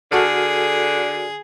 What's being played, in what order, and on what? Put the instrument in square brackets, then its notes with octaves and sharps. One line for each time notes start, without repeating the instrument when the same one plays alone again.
[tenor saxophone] D3 [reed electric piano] F#4 A4 F6 [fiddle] G#4